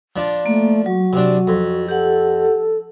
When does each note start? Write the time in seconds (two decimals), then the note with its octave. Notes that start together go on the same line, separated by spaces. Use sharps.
0.16 F3 D4
0.46 A3 A#3
0.86 F#3 F#4
1.13 C3 D4
1.47 F2
1.89 G4 A4 F#5